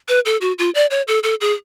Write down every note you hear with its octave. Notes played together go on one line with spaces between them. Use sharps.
B4
A4
F#4
F4
D5
C#5
A4
A4
G#4